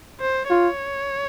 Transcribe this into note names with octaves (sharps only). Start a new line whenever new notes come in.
C5
F4 C#5